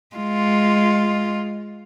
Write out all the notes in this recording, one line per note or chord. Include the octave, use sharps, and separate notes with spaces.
G#3 F4